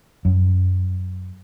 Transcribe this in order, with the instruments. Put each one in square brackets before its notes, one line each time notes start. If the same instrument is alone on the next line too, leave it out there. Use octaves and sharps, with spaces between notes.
[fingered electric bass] F#2